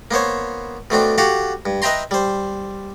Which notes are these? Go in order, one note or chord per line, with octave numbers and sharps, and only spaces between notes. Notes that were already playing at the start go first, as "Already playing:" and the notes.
A#3 B3 C5 C#5
B2 A3 C4 D4
F#4 G4 A4 F5 F#5
G2
B4 D#5 E5 G5 A#5 C6
G3 C5